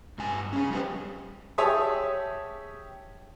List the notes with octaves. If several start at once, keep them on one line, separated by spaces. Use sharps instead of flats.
G2 G#5
C#4 G#4
G3 G#3 G4 B4 C5
G4 G#4 C#5 E5 A5 D#6